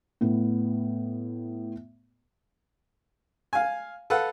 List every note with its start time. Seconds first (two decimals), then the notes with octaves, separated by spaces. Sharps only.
0.21 A2 B3
3.53 F5 G#5
4.10 A4 B4 F5 F#5